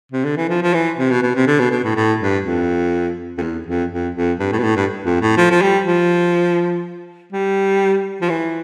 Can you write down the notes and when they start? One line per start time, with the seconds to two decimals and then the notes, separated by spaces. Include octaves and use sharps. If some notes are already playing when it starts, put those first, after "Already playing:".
0.12 C3
0.25 D3
0.37 E3
0.50 F3
0.62 F3
0.74 E3
0.99 C3
1.11 B2
1.23 B2
1.36 C3
1.47 D3
1.60 B2
1.71 B2
1.84 A2
1.96 A2
2.21 G2
2.45 F2
3.38 F2
3.42 E2
3.67 F2
3.92 F2
4.15 F2
4.40 G2
4.52 A2
4.59 B2
4.64 A2
4.76 G2
5.05 F2
5.22 A2
5.37 F3
5.51 F3
5.62 G3
5.86 F3
7.33 G3
8.22 F3
8.30 E3